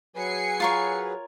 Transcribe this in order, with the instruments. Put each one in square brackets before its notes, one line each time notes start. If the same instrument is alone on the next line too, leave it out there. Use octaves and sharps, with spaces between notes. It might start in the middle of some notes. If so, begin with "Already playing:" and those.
[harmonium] F#3 G#4 B4 [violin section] G#5 C7 C#7
[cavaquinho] F4 A#4 C#5